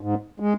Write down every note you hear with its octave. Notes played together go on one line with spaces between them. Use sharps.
G#2
G#3